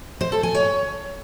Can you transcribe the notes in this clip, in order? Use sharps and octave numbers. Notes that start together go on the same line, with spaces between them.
C5
A4
G#5
C#5